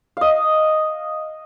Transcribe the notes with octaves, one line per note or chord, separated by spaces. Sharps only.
D#5 F5